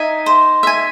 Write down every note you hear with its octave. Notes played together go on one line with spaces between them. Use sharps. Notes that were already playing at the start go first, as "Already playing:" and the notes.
Already playing: D#4 E5 G#5
C5
E5 G#5